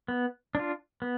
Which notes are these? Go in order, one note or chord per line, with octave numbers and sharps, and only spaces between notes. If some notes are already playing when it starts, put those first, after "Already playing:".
B3
D4 F4
B3